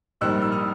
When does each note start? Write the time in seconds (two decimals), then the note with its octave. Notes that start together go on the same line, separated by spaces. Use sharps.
0.21 A#1 G#2 D#3 G3 E6 F#6
0.42 E6
0.52 D#6 F6